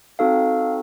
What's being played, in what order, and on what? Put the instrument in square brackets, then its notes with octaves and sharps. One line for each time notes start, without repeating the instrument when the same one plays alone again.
[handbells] C4 D#4 F#4 A4 F5